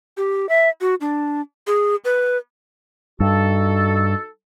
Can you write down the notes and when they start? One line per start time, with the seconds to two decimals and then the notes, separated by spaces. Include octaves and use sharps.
0.17 G4
0.49 E5
0.81 F#4
1.01 D4
1.67 G#4
2.05 B4
3.20 G2 D#4 F#4 A4